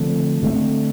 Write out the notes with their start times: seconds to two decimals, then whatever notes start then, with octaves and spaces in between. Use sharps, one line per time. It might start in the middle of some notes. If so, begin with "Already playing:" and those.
Already playing: D3 F3 A3 C4
0.43 D3 F3 A3 C4